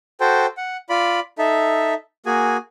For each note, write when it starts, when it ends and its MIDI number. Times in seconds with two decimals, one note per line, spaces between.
0.20 0.46 66
0.20 0.46 69
0.20 0.46 72
0.20 0.46 79
0.57 0.77 78
0.89 1.20 65
0.89 1.20 74
0.89 1.20 83
1.38 1.94 63
1.38 1.94 69
1.38 1.94 76
2.26 2.57 58
2.26 2.57 66
2.26 2.57 68
2.26 2.57 80